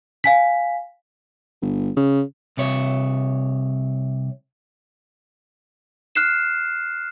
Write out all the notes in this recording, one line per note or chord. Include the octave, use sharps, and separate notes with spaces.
F5 G#5 B6
G1
C#3
C2 C3 C#5
F6 F#6 C7 E7